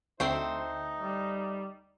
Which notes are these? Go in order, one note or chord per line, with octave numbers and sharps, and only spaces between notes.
D2 A3 C4 D#4 C5 G5 C7
G3